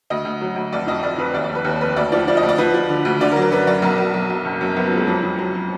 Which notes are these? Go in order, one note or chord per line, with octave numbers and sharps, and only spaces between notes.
D2 D#5
D2
F#3
D2
F1 D5
F2 D#5
F1 D5
F2 B4
D#2 D5
F1 D5
B4
D#2
F1 B4
D2 D5
F3 D5
F3 D5
D#5
D2
D5
F3 B4
F3
D3
D2
D3 D5
A#4
F#3
A#4
F#2 B4
F#2 D5
B1 A#4
B1
B1
B1
F#1
F#2
F#1 B3
F3 F#3
G#3
F2 F#3
F2
F#3
F#3